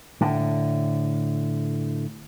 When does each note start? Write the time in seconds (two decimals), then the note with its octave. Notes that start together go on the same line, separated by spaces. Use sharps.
0.21 A2 D3